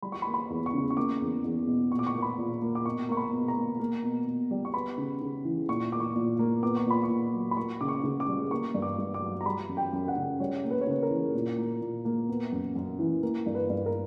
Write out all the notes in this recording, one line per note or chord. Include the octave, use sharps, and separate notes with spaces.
G3 B5
C#6
B5
A#3
B5
E2
C#6
C#3
C#6
A#3 D6
E2
E2
B2
A#2 C#6
D6
C#6
A#3
B5
A#2
A#3
D6
B2 C#6
A#3 C#6
B5
B2
A#5
A#3
A#3
B2
B2
G3
C#6
B3 B5
C#3
C#3
E3
A#2 C#6
A#3 D6
C#6
A#2
A#3
B3 D6
C#6
A#2 B5
C#6
A#2
F#3
B5
A#3 C#6
C#3 D6
C#6
C#3
D6
G3
A#3 C#6
G2
D6
G2
D6
F#3
A#5
G3 B5
F#2
G5
F#2
F#5
C#3
G3 C#5
A#3
B4
C#5
C#3 B4
A#4
E3
A#2
A#3
A#2
A#3
B3
F#2
F#2
E3
A#3 A#4
G2
B4
G2
A#4